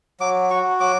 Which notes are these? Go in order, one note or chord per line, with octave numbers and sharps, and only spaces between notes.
F#3 D6
F#4 C#6
F#3 D6